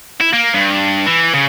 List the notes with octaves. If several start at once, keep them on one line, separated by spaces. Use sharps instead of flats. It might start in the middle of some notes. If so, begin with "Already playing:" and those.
E4
A#3
G2
E3
C#3